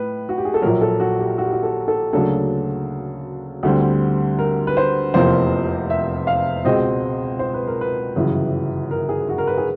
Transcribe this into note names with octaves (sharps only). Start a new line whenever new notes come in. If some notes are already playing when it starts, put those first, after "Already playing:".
Already playing: A2 B4
F#4
G4
G#4
A4
A#1 A#2 F#3 A#4
A4
F#4
G4
F#4
G4
F#4
A4
A4
D2 C#3 F#3 A#3 D4 A4
D2 D3 G3 C4
A#4
B4
C5
F1 E2 C3 F3 A#3 C5
E5
F5
C#2 B2 G#3 C4 D#5
C5
B4
A#4
B4
G1 F#2 C#3 E3
A#4
G#4
F#4
A#4
B4
G#4